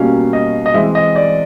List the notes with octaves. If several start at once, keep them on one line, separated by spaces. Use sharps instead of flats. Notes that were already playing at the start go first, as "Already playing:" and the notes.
Already playing: B2 G3 A#3 C#4 F5
D#5
D#5
E3 G#3 C4 E5
D#5
D5